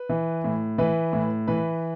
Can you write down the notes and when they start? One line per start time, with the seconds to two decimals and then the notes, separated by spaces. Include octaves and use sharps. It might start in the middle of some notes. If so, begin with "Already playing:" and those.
Already playing: B4
0.09 E3
0.44 A2
0.78 E3 B4
1.13 A2
1.47 E3 B4